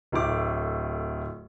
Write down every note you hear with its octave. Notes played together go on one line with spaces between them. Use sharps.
D1 A2 D6